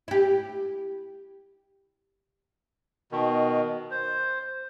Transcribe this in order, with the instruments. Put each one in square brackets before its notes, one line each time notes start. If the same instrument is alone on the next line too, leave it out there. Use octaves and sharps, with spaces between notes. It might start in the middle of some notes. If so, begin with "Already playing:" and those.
[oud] E4 G4
[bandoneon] B2 D#3
C5